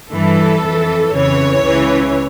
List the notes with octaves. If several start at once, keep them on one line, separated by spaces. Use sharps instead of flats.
G2 E3 A4
F2 E3
F2 C#3 E3 C#5
C#2 C#3 E3